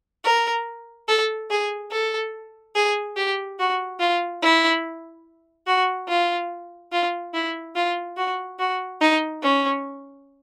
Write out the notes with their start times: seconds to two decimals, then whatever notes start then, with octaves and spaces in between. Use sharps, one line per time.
0.25 A#4
1.08 A4
1.50 G#4
1.91 A4
2.75 G#4
3.17 G4
3.59 F#4
4.00 F4
4.42 E4
5.67 F#4
6.09 F4
6.92 F4
7.34 E4
7.76 F4
8.17 F#4
8.59 F#4
9.01 D#4
9.42 C#4